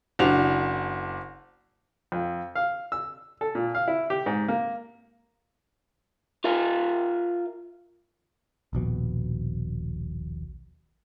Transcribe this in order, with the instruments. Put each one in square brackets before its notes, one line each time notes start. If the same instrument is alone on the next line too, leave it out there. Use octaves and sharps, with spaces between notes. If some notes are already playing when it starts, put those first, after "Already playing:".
[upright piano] F#1 D4 F#4 F7
[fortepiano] F2
F5
E6
A4
A#2
F5
E4
G4
G#2
A#3
[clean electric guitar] F4 A#4 E5 F5
[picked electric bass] D#1 A#1 B2